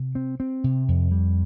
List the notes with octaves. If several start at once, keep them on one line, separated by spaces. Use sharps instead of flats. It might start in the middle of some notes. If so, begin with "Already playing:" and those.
Already playing: C3
C4
C4
C3
F2
G3